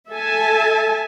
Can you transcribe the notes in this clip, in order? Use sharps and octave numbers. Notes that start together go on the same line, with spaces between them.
A4 E5 G#5 A5